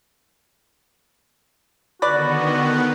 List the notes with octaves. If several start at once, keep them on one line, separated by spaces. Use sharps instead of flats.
D3 D#3 B3 F#4 B4 D5